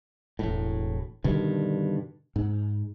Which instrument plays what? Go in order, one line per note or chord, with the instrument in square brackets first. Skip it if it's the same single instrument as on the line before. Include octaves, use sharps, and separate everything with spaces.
[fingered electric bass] E1 A2
G2 B2 D3 D#3
G#2